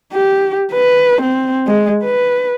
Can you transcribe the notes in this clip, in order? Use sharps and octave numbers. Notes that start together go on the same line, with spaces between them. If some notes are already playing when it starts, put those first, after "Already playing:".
G4
B4
C4
G#3
B4